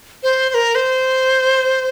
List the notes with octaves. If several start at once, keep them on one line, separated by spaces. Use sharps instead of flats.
C5
C5
A#4
C5